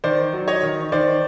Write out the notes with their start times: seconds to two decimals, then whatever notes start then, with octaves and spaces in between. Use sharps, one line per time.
0.04 D#3 C5 D5
0.33 F#3
0.48 C#5 D#5
0.63 D#3
0.92 D#3 C5 D5